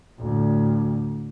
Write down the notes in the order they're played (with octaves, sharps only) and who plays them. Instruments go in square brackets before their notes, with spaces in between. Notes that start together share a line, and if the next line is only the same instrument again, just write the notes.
[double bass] D2 A2